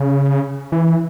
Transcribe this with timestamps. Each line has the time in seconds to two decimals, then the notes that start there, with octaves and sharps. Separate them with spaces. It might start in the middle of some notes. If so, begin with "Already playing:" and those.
Already playing: C#3
0.72 E3